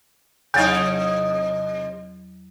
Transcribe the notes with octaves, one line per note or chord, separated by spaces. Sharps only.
E2 C3 F#3 D#4